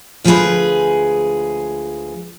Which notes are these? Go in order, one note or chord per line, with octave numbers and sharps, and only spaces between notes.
D2 F3 G#3 F#4 G#4 B4